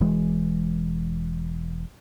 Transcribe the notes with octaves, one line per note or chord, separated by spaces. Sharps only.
E1 E3 G#3